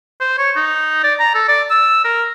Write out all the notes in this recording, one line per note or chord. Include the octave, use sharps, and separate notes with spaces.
C5
C#5
D#4
D5
A#5
A4
D5
E6
A#4